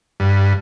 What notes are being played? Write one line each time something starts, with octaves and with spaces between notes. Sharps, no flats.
G2